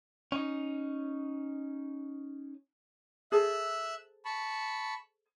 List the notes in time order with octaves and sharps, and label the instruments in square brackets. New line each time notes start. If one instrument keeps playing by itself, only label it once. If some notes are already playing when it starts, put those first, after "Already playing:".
[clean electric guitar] C#4 D#4
[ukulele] G#4 A4 C5 [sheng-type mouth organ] E5 E6 F#6
[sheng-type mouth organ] A5 B5 C#6